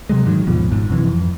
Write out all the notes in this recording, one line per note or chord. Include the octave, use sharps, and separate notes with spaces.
C3 F#3 G#3
G#2 D#3 F3 F#3
D#2 G#2 B2 F3
G#1 G#2
F#2 C3 D#3 E3
F2